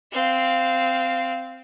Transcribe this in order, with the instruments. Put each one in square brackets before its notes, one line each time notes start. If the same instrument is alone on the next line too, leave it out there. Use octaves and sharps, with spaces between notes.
[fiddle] C4 F5